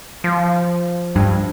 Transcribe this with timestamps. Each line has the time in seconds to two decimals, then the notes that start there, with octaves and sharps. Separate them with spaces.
0.24 F3
1.16 G2